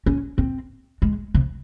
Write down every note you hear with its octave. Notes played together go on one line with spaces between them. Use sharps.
C#4
C4
G#3
C3